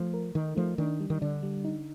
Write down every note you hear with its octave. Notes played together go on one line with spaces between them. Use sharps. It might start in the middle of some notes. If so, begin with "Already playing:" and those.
Already playing: F3 A3
A#4
D#3 D#4
F3 A3
D#3 D4
G3
D#3
D3 D4
G3
D#4